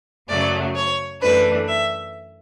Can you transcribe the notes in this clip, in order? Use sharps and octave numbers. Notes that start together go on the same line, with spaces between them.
F#2 C#3 F#3 A3 D5
C#5
F#2 E3 A3 D4 B4
E5